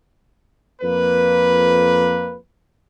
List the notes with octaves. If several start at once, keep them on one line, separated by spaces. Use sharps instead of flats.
F2 A#3 B4